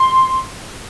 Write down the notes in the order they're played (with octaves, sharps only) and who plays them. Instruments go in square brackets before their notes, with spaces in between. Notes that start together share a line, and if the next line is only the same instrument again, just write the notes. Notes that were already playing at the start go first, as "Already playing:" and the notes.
Already playing: [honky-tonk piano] C6